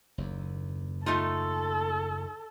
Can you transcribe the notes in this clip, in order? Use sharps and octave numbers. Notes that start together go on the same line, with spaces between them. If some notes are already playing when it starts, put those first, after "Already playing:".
F#1 D#2
A3 D#4 F4 A4